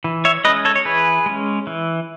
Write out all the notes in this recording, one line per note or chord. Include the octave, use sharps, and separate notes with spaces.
E3
C#5 E5
G#3 C#4 B4 D#5
A4 C#5
C#5
E3 G#4 B4
G#3 C#4
E3